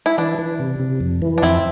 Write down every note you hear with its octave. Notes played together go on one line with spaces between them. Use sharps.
E4
E3 D4
E3
C3
C3
F2
E3
D4
F2 C4 E4